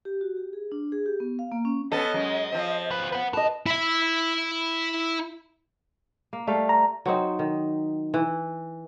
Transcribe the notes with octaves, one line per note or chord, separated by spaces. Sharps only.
G4
F#4
G4
G#4
D4
G#4
G4
B3
F5
A#3
C#4
B3 C#4 A4 D#5
F#2 G#3
F3 C4
D2 B4
B4 F#5
A2 B4 D#5 A5
E4 E5
A#3
G3 A3 F5
A#5
F#3 C4 D#4
D#3
E3